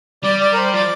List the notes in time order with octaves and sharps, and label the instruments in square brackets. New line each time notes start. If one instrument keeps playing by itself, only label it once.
[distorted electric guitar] G3 [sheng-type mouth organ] D5
[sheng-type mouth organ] D5
A#4
C5
[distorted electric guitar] F3 [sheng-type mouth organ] D5